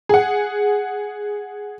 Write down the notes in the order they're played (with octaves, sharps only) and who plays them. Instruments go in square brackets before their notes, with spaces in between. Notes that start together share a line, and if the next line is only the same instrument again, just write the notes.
[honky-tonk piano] G#4 F#5